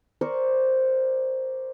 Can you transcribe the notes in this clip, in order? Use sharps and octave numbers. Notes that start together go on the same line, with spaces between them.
A#4 C5 D5 C#6